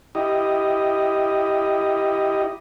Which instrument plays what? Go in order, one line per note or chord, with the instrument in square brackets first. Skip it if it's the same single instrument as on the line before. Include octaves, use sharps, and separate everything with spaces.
[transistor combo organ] E4 G4 D#5